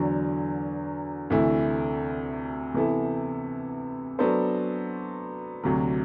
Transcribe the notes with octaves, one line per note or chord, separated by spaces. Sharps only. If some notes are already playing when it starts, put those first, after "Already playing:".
Already playing: E2 D3 F#3
D2 C3 E3 A3 E4
C3 E3 B3 E4 A4
F#3 B3 D4 A4 C5
D2 C3 F#3